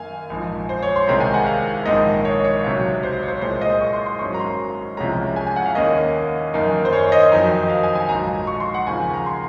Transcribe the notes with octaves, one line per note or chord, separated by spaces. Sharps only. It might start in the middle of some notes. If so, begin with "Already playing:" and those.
Already playing: F#2 D#3 A#3 F5 G#5
A#1 G#2 F3
C5
C#5
C6
C2 C3 D#3 G#3 C4 A#5
G#5
F#5
F5
A#1 G#2 D#3 A#3 D#5
C#5
C#5
C#2 C3 F#3 C#5
C5
C#5
C5
C2 A#2 G#3 C5
D#5
C#6
C6
C6
G#1 G#2 F#3 A#3 C#4 C#6
A#5
C6
C2 C3 F3 G#3 C#4 A#5
G#5
G#5
F#5
F5
D#2 D#3 A#3 C#4 D#5
F#2 D#3 A#3 D#4
C5
C#5
D#5
F2 D#3 F#3 C4 D#4
F5
G#5
G#5
A#1 G#2 F#3 A#5
C#6
C6
F#5
D#2 C#3 F3 C4 G#5
A#5
C6